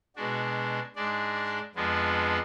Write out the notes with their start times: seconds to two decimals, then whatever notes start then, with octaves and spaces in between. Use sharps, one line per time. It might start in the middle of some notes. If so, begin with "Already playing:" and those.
0.16 B2 G#3 D4 F#4
0.95 G#2 G#3 D4 D5
1.35 D5
1.75 F2 F3 G#3 B3 D4